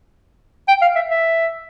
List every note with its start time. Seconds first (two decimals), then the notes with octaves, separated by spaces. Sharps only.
0.68 G5
0.81 F5
0.95 E5
1.10 E5